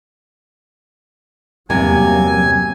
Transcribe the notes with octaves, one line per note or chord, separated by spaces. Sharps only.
E2 G2 C3 F#3 A#3 G#5